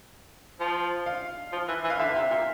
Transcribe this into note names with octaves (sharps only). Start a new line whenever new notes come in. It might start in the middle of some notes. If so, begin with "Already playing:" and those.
F3
F5
F3
E3
E3
F5
D3 E5
C3
A#2